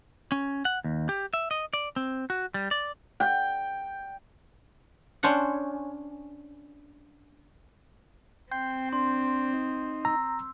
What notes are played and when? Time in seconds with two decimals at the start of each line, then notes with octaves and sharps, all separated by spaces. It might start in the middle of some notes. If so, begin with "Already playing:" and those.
0.32 C#4
0.65 F#5
0.84 D#2
1.09 G4
1.34 E5
1.51 D#5
1.74 D5
1.96 C4
2.30 F#4
2.54 G3
2.71 D5
3.20 G5
5.23 C#4 D4 C5 C#5 F#5
8.51 C4 G5 C6 G6
8.93 D4 C6
9.54 D#4
10.05 A#5 E6